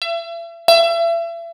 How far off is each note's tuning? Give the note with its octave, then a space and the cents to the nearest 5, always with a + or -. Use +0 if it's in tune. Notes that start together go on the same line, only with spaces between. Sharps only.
E5 +40
E5 +35